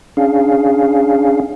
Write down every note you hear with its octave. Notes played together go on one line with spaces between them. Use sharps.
C#4 D4 G#4 F5